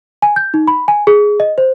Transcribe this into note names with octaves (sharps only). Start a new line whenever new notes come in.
G#5
G6
D#4
B5
G#5
G#4
D#5
C5